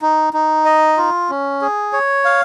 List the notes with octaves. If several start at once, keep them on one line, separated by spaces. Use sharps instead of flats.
D#4
D#4
D#5
F4
C#4
G#4
C#5
F5